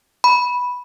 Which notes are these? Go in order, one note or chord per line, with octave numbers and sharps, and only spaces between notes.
B5